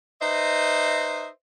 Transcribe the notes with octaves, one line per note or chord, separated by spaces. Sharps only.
D#4 B4 C5 D#5 E5